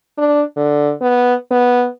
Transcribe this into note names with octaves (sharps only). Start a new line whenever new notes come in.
D4
D3
B3
B3